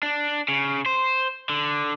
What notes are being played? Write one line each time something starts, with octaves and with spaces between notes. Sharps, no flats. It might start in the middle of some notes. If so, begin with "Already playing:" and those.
D4
C#3
C5
D3